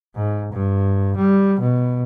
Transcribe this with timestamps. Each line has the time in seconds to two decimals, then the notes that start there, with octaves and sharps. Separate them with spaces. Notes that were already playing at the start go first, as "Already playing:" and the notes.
0.15 G#2
0.52 G2
1.16 G3
1.60 B2